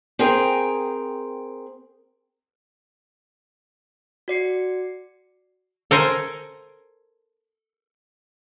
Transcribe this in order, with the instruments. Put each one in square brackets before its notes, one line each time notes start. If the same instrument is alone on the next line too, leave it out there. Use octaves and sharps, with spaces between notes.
[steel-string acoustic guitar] C4 G#4 A#4 G5 G#5
[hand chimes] F#4 D5 C7 C#7
[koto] A4 A#4 C5 G#5